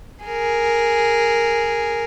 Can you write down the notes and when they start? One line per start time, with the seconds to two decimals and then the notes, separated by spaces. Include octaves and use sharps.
0.25 G#4 A#4